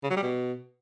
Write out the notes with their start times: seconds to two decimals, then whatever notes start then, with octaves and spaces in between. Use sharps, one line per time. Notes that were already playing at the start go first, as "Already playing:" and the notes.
0.03 C#3
0.10 F#3
0.16 G3
0.23 B2